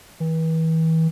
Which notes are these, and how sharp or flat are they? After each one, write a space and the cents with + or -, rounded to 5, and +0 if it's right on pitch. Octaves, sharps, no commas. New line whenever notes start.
E3 -35